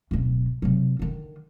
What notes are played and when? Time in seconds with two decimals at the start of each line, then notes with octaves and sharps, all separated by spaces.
0.11 D1 B1
0.62 C3 F#3
0.99 D3 D#3